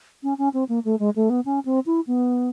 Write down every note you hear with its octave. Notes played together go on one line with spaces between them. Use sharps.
C#4
C#4
C4
A#3
A3
G#3
A3
B3
C#4
C4
E4
B3